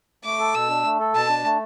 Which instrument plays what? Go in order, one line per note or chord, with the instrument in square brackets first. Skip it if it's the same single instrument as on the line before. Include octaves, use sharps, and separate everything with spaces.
[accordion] A3 [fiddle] D6
[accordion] A4
[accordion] B2 [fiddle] E6
[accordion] D4
A3
A4
[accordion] B2 [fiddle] A5
[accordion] D4
A3